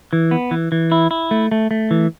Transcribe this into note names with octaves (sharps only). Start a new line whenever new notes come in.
E3
B3
E3
E3
E4
E4
A3
A3
A3
E3